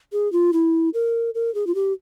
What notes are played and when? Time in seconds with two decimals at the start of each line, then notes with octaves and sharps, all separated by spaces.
0.12 G#4
0.32 F4
0.53 E4
0.94 A#4
1.35 A#4
1.55 G#4
1.67 F4
1.75 G4